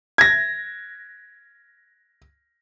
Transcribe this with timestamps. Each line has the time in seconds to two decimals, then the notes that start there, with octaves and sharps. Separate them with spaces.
0.18 G#6 A#6